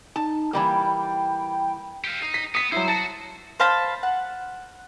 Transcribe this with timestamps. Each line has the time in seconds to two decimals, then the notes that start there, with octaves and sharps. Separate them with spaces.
0.16 D#4 A5
0.53 E3 G3 A#3 G5
2.04 G4 F5
2.22 D#4 C7
2.34 B6
2.55 B3 D#6 B6
2.72 F#3 E4 C5
2.88 F#4 A5 A6
3.60 C5 F5 A5 B5
4.03 F#5